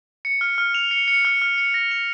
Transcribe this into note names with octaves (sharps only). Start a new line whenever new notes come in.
C#7
F6
F6
F7
C#7
C#7
F6
F6
C#7
A#6
F7